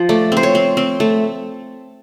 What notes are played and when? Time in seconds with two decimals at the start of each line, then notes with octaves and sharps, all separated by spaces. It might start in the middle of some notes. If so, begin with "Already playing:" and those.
Already playing: F3
0.09 A3 D5
0.32 C4 C5
0.43 C#5
0.55 C4
0.77 C4
1.00 A3